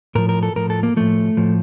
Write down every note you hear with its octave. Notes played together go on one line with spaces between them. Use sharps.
A2 F3 A#4
A#4
A4
A2 F3 A#4
A4
A#3
A2 F3 A3
A2 F3